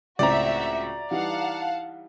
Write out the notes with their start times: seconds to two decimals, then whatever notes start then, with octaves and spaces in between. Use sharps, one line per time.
0.19 C#2 A2 C4 F#4 D5 E5 A#5
1.11 E3 G3 D#4 F5 F#5 A5